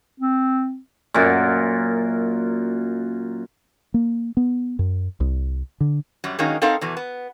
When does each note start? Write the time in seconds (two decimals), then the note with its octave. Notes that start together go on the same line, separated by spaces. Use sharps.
0.20 C4
1.14 F#2 A#2
3.94 A#3
4.37 B3
4.79 F#2
5.20 C2
5.81 D3
6.24 F#2 F#3 G3
6.39 D#3 F#3 G#3 A#3 C#4 D#4
6.62 C4 D#4 A4 A#4 F5 F#5
6.81 E2 B2 E3
6.97 B3